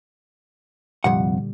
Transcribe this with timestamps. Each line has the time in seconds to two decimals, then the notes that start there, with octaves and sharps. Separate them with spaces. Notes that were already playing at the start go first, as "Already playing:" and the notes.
1.04 C2 F2 A#2 D3 G3 F#5